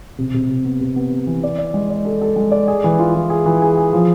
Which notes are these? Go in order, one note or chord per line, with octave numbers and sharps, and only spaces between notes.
C3
C3
C3
B3
C3
B3
B3
E3
D5
D5
G#3
D5
A4
A4
G#3
D5
G#4
E3
F4
E3
G#4
E3
G#4
G#4
F3